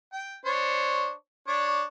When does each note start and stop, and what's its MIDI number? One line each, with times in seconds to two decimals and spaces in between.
0.13 0.36 79
0.46 1.12 62
0.46 1.12 72
0.46 1.12 73
1.48 1.83 62
1.48 1.83 73
1.48 1.83 86